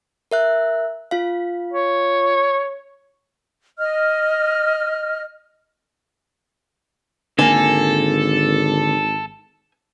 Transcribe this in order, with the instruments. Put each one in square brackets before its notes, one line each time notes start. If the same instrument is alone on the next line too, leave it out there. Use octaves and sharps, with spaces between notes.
[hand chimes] A#4 E5 F#6
F4 F5
[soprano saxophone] C#5
[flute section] D#5 F6
[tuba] G#1 [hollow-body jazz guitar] D3 A#3 [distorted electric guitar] A4 [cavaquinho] G#5